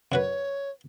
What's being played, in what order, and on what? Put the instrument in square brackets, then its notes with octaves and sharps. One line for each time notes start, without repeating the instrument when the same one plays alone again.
[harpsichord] F#2 F#4 B4 [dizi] C#5